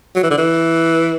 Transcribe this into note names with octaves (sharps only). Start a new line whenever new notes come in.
F#3
E3
D3
E3